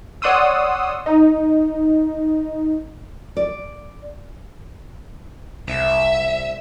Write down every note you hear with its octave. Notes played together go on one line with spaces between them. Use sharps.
C#5 D5 F#5 C6 D#6 E6
D#4
D5
C2 E5